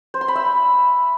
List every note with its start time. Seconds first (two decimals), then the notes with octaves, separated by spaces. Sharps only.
0.14 C5
0.21 C6
0.28 B5
0.35 E5